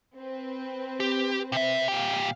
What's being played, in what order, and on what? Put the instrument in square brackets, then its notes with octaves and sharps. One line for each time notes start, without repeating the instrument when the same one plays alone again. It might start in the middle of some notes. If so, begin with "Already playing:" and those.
[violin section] C4 B4
[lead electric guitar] G4
C3 E5
[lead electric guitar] A#2 G4 [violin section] F5